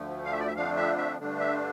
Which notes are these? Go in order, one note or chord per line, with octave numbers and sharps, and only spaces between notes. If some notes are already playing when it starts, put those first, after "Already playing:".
Already playing: D2 D3 F3 A3
F5
E5
D5
E5
F2 D3 F3 A3 D4 F5
E5
E5
G2 D3 A3 D4
E5